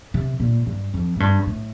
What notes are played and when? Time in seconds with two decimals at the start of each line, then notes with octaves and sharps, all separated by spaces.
0.14 C3
0.40 A#2
0.67 G2
0.94 F2
1.16 A2
1.20 G2
1.47 A2